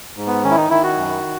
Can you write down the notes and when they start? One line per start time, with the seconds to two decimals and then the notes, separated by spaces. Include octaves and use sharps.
0.17 G#2
0.27 B3
0.44 D#3 C#4
0.51 E4
0.57 D#4
0.70 D#3 E4
0.83 F#4
0.97 F#2